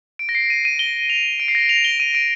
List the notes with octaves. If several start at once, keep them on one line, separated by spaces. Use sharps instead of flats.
D7
A#6
C7
D#7
D#7
G7
F7
D7
C7
A#6
F7
G7
D#7
D7